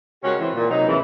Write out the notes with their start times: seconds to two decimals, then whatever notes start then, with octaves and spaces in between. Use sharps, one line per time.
0.23 C#3 G#3 C#4 F#4 G4 A#4
0.40 E3 C4
0.55 A#2
0.70 C3 F#3 D#4
0.88 E2 A2 C#3 E3